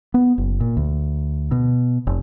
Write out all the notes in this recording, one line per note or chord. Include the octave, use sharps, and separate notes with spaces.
B3
F#1
A#2
D2
B2
F1